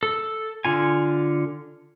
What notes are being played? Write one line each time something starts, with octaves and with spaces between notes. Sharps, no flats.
A4
D3 F4 G#5